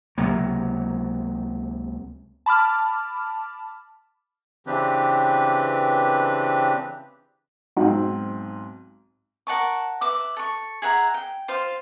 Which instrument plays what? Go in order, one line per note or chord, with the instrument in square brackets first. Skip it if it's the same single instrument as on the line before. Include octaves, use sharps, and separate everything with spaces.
[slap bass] C#2 C3 F#3 A#3
[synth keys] A5 B5 D6 F6
[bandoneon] C#3 E3 C4 D4 G4 B4
[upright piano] B1 G#2 C4 [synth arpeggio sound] F#3 D#4 F#4
[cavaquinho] A#4 F#5 A5 C#6
B4 E5 D6
A4 C#6
G#4 E5 F#5 A#5
G5
F4 C5 F5